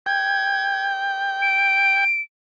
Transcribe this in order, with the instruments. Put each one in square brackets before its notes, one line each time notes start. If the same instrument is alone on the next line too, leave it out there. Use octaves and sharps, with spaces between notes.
[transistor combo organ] G5 [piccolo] G#6
[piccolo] D7